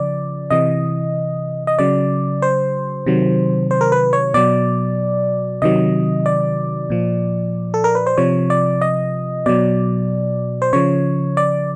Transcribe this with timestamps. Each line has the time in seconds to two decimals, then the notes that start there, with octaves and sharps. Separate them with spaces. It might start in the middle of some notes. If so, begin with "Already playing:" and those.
Already playing: C#3 F3 D5
0.50 C3 E3 D#5
1.67 D#5
1.79 C#3 F#3 D5
2.42 C5
3.06 C3 D#3 F#3
3.71 C5
3.81 A#4
3.92 B4
4.13 C#5
4.34 B2 F#3 D5
5.62 C3 D#3 F#3 D#5
6.26 D5
6.90 A#2 F3
7.74 A4
7.84 A#4
7.95 B4
8.07 C5
8.17 C3 F3 C#5
8.50 D5
8.81 D#5
9.46 B2 F#3 D5
10.62 C5
10.73 C#3 F3 C#5
11.37 D5